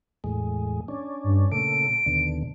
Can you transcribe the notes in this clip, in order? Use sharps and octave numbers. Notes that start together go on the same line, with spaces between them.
E2 A2 G#3
C#4 D4
G2
A#2 C#3 A3 D7
D#2 B2 D3